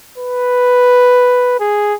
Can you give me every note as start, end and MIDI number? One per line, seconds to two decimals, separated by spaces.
0.18 1.57 71
1.60 1.94 68